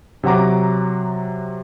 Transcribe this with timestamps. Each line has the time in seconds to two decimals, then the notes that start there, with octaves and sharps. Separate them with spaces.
0.23 C3 F#3 F#5 A#5 D6